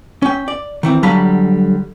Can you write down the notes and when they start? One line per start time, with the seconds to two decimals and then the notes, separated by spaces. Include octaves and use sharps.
0.22 C#4 G5
0.48 D5
0.83 D#3 E3 C4
1.03 D3 F#3 G3 F5 A5 B5